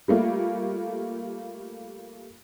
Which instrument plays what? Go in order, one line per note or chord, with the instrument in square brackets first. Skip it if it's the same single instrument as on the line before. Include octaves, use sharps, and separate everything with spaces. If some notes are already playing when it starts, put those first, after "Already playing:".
[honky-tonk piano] G3 A3 A#3 F4